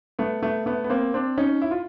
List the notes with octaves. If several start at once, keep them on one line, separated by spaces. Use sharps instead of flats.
A3 B3
A3 B3
A3 B3
B3
A#3 C4
C4 D4
C#4 D#4
E4
F4